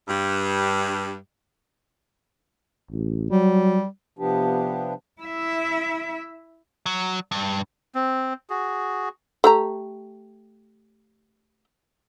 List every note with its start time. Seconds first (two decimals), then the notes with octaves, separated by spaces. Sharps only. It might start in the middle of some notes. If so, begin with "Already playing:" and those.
0.08 G2
2.91 A1
3.30 F#3 G3
4.19 C3 F3 B3 D4 G4
5.22 E4 E5
6.86 F#3
7.32 G2
7.95 C4
8.50 F#4 G#4
9.44 A3 G4 A#5